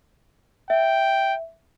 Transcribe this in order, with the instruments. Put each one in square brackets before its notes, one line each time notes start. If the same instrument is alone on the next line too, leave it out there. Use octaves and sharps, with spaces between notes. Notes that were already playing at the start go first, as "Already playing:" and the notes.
[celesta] E5 [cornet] G5